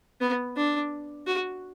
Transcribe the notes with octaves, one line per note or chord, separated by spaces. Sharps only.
B3
D4
F#4